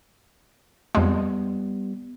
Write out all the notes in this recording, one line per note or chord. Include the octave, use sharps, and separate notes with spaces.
F2 G3 G#3 B3